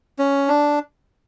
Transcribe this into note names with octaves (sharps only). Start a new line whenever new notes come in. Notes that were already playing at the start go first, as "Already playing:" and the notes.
C#4
D4